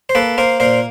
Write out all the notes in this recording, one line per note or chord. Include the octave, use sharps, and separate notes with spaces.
C5
A#3 A4 B4
A#3 A#4 C5
A#2 A#4 C5